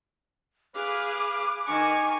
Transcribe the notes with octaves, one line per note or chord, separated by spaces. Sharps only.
G#4 B4 F5 D6
D#3 G#5 C#6